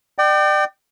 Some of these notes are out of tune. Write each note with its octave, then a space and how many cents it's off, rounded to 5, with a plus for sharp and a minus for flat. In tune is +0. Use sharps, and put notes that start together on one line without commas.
D5 +35 G5 -20